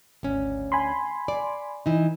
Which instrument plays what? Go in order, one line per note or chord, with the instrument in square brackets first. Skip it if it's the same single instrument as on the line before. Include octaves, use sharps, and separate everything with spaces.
[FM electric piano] G#1 [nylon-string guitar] D2 C#4
[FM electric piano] G#5 B5 C6
[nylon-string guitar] D5
E3 D#4